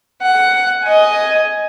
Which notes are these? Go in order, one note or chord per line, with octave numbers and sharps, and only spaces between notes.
F#5
D#5 G#5